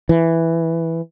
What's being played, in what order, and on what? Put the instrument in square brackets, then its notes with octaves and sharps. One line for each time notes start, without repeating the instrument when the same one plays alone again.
[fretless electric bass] E3